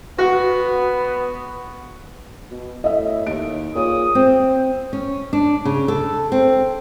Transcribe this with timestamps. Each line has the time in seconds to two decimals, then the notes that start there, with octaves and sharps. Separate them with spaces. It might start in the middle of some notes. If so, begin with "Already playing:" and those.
0.18 B3 F#4
2.51 B2
2.84 A2 D#5 E5
3.27 D#2 D7
3.75 A#2 G#4 C#5 D#6
4.15 C4
4.93 C#4
5.33 D4
5.65 C#3
5.88 A4
6.32 C4